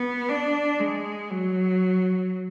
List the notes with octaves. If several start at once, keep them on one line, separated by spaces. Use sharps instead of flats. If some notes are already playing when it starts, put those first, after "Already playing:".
Already playing: B3
D4
G#3
F#3